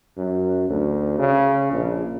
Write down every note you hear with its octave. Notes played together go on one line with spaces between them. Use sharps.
F#2
D2
C#3
A#1